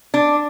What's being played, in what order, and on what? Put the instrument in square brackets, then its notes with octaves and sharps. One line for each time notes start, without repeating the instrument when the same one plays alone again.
[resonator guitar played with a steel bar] D4